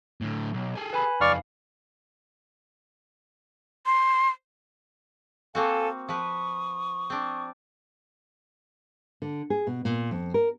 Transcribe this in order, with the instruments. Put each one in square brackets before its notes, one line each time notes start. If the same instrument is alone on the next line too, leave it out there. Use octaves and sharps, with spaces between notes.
[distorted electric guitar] A2 D3
B1
G#4 A4
[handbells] B4 G#5 B5
[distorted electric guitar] F2 D#4 [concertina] D5 C#6 F6 [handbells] F5
[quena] C6
[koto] A#3 C4 F#4 [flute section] A4 F5 G#5
[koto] F3 B4 [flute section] C#6 D#6
[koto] C4 D4
[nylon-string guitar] D3
G#4
B2
A#2
F2
A#4